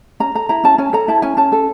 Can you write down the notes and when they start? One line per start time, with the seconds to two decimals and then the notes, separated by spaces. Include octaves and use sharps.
0.20 C#4 A#5
0.35 A4 A#5
0.49 E4 A#5
0.63 C#4 A5
0.78 C#4 G#5
0.93 A4 A#5
1.08 E4 A5
1.22 C#4 G#5
1.37 C#4 A5
1.52 A4